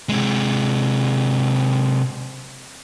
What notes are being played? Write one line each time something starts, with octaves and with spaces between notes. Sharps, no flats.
C3 G#3